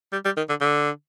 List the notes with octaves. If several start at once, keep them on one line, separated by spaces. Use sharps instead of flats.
G3
G3
D#3
D3
D3